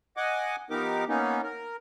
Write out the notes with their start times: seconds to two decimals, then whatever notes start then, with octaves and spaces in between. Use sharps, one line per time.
0.17 D#5 F#5 G#5 D6
0.70 F3 B3 D#4 G4 A#4 D6
1.09 A#3 B3 C#4 D#4
1.43 A#4